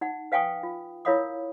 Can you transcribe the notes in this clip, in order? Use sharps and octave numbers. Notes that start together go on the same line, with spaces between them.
D#4 F#5
B4 F5 G5 G#5 C#6 D#6
F4
E4 A#4 C#5 F5 B5 D#6